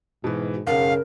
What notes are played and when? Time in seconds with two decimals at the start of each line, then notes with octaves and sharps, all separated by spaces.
0.24 G#2 B2 E3
0.67 F#1 B1 C#3 A#4 F5 F#5